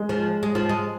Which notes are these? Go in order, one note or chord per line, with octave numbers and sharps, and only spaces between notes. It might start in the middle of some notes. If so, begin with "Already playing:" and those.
Already playing: G#3
F3
G#3
F3
G#3